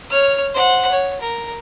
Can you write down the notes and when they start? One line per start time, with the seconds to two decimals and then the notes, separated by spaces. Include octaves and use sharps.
0.10 C#5 F6
0.54 C5 F#5
0.91 C#5
1.21 A#4